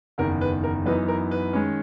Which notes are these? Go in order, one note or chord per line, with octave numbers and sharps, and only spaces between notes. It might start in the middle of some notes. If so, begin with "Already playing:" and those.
F#1 E2 D#3 A#4
B4
A#4
F#2 E3 B3 D#4 B4
A#4
B4
D#3 G#3 C#4